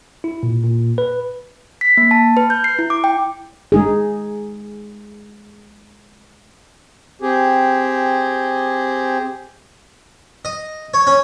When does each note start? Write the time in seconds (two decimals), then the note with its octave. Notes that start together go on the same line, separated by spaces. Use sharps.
0.24 E4
0.43 A#2
0.63 A#2
0.98 B4
1.81 B6
1.97 A#3
2.11 A5
2.37 B4
2.50 G6
2.64 C7
2.79 E4
2.90 D6
3.04 G5
3.72 G#3 D#4 G#4
7.22 C4 G4 G#4
10.45 D#5
10.94 C#5
11.07 C#4